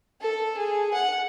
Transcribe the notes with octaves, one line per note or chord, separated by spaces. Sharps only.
A4
G#4
F#5